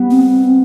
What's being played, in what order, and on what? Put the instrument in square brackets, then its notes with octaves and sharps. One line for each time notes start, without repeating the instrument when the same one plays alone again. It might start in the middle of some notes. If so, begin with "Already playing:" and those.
Already playing: [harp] G3 B3
[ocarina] C4